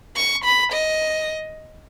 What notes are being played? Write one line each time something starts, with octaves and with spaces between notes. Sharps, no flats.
C#6
B5
D#5